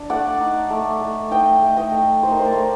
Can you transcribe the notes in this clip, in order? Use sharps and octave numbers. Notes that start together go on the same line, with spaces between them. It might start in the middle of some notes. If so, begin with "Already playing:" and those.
Already playing: D4
A3 D5 F#5
D#4
A3
A3
D#4 D#5 G5
A3
D#5 G5
A3
D#4 C5 D#5
A#4
C5
A#4 D5
A3